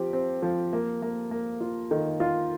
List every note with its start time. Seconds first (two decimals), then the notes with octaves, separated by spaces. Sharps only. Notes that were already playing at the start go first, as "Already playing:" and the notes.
Already playing: F3 C4 G4
0.13 C4
0.42 F3
0.73 A#3
1.02 A#3
1.31 A#3
1.61 F4
1.91 D#3
2.20 F4